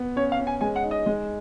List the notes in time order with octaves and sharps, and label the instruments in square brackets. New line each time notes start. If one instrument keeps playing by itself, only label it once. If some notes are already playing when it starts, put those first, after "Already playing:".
Already playing: [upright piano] B3
[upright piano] C#4 [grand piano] C#5
[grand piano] F5
[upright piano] C#4
[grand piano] G#5
[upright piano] G#3 [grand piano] G#5
[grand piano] F#5
[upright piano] D#4
[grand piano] D#5
[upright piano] G#3